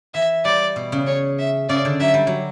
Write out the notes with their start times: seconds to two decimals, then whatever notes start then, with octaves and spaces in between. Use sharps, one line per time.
0.14 E3 E5
0.45 G3 D5
0.76 B2
0.92 C#3
1.07 C#5
1.39 E5
1.69 C#3 D5
1.85 D3
2.00 F#3 E5
2.14 G3
2.27 F#3